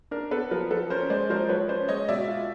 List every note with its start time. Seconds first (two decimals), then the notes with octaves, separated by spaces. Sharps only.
0.11 D4 A#4
0.31 B3 A4 B4
0.51 F3 A#4
0.71 F3 A4 B4
0.90 C#4 A#4 C5
1.10 G#3 C5 D5
1.30 F3 A#4 C5
1.49 F3 B4 C#5
1.69 C#4 C5 D5
1.88 G#3 C#5 D#5
2.09 B2 D5 E5
2.28 F4